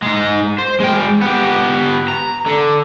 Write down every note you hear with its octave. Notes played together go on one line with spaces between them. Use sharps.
G#3 D#4
C5
G#3 G5
B3 G4
A#5
D3